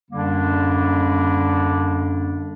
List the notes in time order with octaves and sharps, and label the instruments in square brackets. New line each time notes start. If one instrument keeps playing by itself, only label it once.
[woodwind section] F#2 D3 G3 A#3 D4